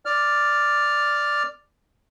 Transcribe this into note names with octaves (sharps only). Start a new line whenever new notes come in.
D5 F6